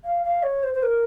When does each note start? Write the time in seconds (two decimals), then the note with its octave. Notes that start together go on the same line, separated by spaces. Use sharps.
0.05 F5
0.24 F5
0.43 C#5
0.63 C5
0.74 C5
0.83 A#4